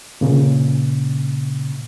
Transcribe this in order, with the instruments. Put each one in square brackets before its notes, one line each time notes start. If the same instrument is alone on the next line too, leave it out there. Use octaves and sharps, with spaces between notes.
[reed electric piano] A#2 C#3